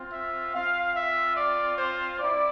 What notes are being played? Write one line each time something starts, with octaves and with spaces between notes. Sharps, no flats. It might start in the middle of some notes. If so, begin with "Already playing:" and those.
Already playing: C4 F4
E5
C4 F4 F5
E5
D5
C5
C4 E4 D5